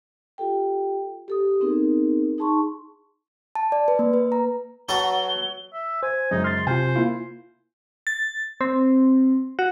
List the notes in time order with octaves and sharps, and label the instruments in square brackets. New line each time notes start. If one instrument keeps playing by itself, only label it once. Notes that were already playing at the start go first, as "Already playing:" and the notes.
[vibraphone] F4 G4 A4 G5
G4 A4 D#6
B3 C4 D#4 G#4 A#4
D#4 G#4 A5 C6 C#6
[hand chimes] A5
D5
B4
A#3
B4
A#5
[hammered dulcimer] F#3 [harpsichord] F#4 A4 B4 [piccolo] G7
[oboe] E5
[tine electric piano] C5 [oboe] G#5
[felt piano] F#2 C#3 G#3 [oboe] D#4
[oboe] C6 [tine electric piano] F6 A6
[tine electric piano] C3 F4 [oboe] C5 [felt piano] G#5
[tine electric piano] A#3 E4 F4
[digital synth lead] A6
C4
F#4